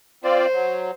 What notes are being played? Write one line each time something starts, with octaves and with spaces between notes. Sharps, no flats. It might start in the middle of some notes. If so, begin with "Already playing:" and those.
C4 F4 C5 D5
F#3